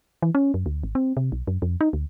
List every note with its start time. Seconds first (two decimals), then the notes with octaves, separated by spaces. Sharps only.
0.22 E3
0.35 C#4
0.54 F#2
0.66 D2
0.83 G#1
0.95 C4
1.17 C3
1.32 B1
1.47 F#2
1.62 F2
1.81 D#4
1.93 D2